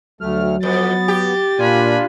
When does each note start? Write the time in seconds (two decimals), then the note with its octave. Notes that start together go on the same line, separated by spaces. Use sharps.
0.21 D2 F#3 A3 F6
0.63 F2 B3 A6
1.08 G4
1.59 A#2 D4 F4 G#5 B5